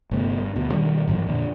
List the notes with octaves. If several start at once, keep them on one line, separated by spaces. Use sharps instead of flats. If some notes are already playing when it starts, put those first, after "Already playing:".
G1 C3 A3 B3
G2
D2 B2
B2 D#3 G3
G1 A2 E3 F#3
F2 A#2 D3